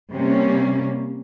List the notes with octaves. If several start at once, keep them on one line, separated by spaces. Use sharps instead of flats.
C3 G3 A#3 C#4